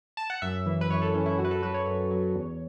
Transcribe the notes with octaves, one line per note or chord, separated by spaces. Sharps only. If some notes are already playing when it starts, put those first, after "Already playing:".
A5
F#5
F#2 E5
E3
B4
F#2 C#5
A4
E3 C#4
E4
F#2 F#4
B4
A4
F#3 B4
C#5
F#2
F#3
E2